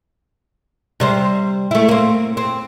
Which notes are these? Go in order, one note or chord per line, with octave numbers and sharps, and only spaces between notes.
C3 G3 C5
A3 E4
A#3 C4
C4